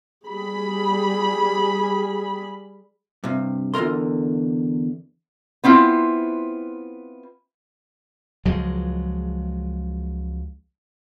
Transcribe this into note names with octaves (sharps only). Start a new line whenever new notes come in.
G3 G#4 B5
G2 C3
E2 D3 F4 A#4 C6
B3 C4 E4 F4
C#2 F3 F#3 G#3